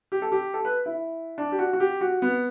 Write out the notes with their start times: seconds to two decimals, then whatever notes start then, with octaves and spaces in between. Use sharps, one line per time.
0.12 G4
0.22 A4
0.32 G4
0.54 A4
0.65 B4
0.86 E4
1.38 D4
1.52 G4
1.59 F#4
1.73 F#4
1.80 G4
2.01 F#4
2.22 B3